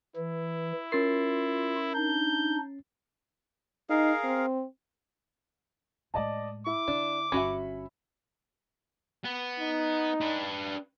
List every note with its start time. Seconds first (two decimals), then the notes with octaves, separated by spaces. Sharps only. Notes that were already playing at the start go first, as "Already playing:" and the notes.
0.16 E3 E4
0.92 C#4 F4 A#4 A6 C7
1.95 D4 D#4 G6
3.90 D#4 G#4 A#4 F5
4.24 C4
6.14 A2 G#3 D5 D#5 A5
6.66 E4 D6
6.88 D3 D4
7.32 G1 D3 C#4 F#4 E5 G#5 B5
9.24 B3
9.60 D#4
10.21 D4 B4